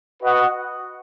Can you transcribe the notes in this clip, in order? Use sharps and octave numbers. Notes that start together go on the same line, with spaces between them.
F#4 B4 D#5 F#5